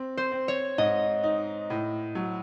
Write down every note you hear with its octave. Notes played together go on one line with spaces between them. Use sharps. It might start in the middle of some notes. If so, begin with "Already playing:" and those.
Already playing: C4
C5
C4
C#5
G#2 D#5
D#4
A2
F#3